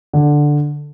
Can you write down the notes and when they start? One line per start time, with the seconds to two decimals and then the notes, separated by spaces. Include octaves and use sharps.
0.13 D3